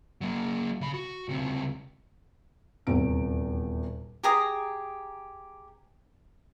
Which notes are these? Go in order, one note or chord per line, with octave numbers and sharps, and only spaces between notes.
F#3 A#3
C#3 B5
F#4
C#2 C3
D#1 E2 C3 D7
G4 G#4 A#5 D#6